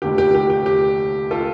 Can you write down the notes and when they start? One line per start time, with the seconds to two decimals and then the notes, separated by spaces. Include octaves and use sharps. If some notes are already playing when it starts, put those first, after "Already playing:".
0.02 F1 D#2 D3 G4
0.18 G4
0.35 G4
0.50 G4
0.66 G4
1.31 F4 A4